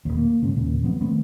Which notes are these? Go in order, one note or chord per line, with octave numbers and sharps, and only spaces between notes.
D#1 G#1 D#2
A#3
G#2 C#3
D#2 A#2 C#3
F3 F#3 B3 C4
D#3 A3 B3 C4